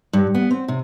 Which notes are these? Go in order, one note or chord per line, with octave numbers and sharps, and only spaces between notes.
G2
B3
C4
C3